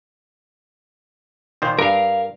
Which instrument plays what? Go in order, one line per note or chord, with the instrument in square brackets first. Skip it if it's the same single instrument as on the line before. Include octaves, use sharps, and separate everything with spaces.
[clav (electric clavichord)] A#2 D#3 C5
[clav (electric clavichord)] G2 [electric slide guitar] A#4 F5